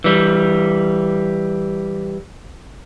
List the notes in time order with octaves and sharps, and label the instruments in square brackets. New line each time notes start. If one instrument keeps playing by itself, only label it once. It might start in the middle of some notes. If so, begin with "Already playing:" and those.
[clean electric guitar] E3 G3